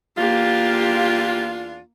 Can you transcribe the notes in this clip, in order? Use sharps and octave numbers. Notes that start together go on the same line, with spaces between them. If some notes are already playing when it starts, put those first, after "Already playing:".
E2 A#3 D4 F4 G4